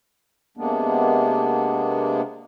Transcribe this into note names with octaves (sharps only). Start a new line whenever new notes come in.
C3 G#3 A#3 B3 D4